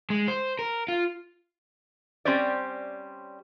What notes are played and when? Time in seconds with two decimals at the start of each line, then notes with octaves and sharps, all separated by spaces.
0.10 G#3
0.28 C5
0.59 A#4
0.88 F4
2.25 G3 C4 C#4 C5 D5